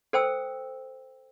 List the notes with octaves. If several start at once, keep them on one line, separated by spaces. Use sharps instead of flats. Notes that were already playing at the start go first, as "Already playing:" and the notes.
A4 C5 G5 E6